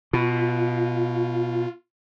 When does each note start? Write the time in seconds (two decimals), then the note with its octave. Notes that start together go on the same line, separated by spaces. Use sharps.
0.13 B2 F4